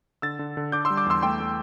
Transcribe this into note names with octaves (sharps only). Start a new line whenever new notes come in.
D3 E6 A6
D3
D3
D4 D6 G6
C6 E6
G3
D6 G6
E2 C6 E6
A3 G5 C6
A3